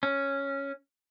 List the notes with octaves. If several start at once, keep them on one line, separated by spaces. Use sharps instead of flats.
C#4